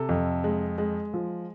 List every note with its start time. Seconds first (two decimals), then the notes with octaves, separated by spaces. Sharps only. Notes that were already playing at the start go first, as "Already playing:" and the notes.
Already playing: C3 A4
0.09 F2
0.44 G#3
0.78 G#3
1.14 F3